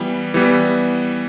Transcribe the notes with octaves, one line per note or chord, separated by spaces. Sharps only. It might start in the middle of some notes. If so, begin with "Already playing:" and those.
Already playing: E3 G3 B3
E3 G3 B3